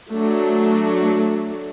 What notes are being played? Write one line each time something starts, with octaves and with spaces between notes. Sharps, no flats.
F#3 A3 D4